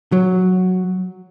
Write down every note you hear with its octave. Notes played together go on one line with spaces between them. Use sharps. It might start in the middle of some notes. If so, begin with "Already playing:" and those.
F#3